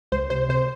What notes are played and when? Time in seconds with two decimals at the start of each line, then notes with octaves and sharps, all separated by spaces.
0.12 C#2 C5
0.30 C3 C5
0.49 C3 C5